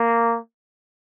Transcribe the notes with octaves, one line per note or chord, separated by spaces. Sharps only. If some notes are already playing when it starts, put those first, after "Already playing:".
Already playing: A#3